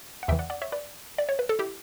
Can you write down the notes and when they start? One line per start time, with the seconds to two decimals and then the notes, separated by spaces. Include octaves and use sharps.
0.23 F#5
0.28 E2 C#3 E3 E5 G5
0.39 D5 F#5
0.50 D5 F#5
0.62 C#5 E5
0.72 B4 D5
1.18 D5
1.29 C#5
1.39 B4
1.49 A4
1.59 E4 G4